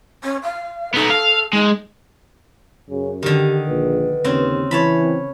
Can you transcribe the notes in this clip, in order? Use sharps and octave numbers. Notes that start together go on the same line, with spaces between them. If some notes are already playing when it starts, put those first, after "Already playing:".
C#4
F5
B3 D#4 A4
F5
G#3 D#4
F#2 C#3
D3 D#3 G4
A#1 B4
D#2 C#3 C4
E3 C#5 A5 B5
C4